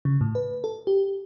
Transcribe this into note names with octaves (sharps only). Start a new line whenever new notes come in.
C#3
A2
B4
A4
G4